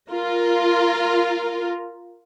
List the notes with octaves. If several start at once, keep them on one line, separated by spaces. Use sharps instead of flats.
F4 A#4